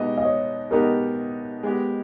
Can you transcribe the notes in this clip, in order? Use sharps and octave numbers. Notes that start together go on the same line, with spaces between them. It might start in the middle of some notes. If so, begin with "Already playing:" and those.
Already playing: B2 G#3 B3 D#4 G4 D#5
D#5
C#5
B2 G#3 B3 D#4 G4 A#4
G#3 B3 G4